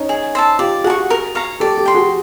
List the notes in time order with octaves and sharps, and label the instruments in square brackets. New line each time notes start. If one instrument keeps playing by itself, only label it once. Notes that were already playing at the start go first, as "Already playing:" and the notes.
Already playing: [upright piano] C#4 D#4
[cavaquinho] G#4
C5 E5 A5
[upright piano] F4 G4 [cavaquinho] D5
[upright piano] F#4 G#4 [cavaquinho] F#5 A5
[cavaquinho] C#6
A#4
C#5 F5 A#5
[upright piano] G4 A4 [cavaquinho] D5
[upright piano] G4 A4
[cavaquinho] G5 C6
[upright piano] F#4 G#4